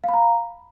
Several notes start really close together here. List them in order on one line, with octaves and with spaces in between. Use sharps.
F5 B5 A#5